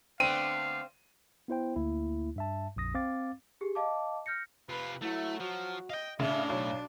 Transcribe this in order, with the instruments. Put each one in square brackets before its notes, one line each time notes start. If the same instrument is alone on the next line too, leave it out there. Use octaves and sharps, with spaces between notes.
[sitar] D3 A3 B3 [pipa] C4 [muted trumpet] F5 [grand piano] D#7
[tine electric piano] B3 E4 C5 G5
D2 A#3 E4
G2 E5 A5
A#1 F2 D#6 A#6
C4 F5 D6 A6
[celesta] G4 G#4
D#5 F5 A5 D6
F6 G6 A#6 C#7
[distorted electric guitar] C3 F4 [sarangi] B4
[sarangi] F#3 [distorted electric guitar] A3 [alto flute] E4
[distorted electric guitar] F3 [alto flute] F#4
[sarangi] D#5 [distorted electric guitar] F5 G5
[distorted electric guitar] A2 [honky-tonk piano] C#3 [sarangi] D4 [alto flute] E5
[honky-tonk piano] B1 [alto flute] C#5